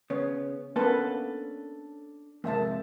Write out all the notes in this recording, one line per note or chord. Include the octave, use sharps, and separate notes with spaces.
C#3 B3 C#5
A#3 B3 C#4 D4 A4 B4
F2 G#2 C3 A#3 E5 A5